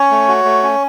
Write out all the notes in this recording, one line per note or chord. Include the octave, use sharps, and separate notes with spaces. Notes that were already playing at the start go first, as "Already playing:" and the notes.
Already playing: C#4 C#5
A3
F#4
A3
C#4